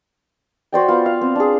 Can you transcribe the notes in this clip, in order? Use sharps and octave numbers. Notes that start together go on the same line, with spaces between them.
F#4 C5 D5 G5
B3 F4
F5
C4
D4 G#4